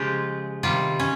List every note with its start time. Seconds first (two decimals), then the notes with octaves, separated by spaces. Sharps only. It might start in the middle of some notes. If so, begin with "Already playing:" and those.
Already playing: C#3 F3 G#3 F4 G4
0.63 C3 D#3 G3 F4
1.00 C#4